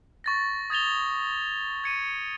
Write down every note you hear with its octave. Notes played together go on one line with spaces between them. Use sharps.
C#6 A6 A#6
D#6 G#6 A6 F7 G7
G#6 C#7 D#7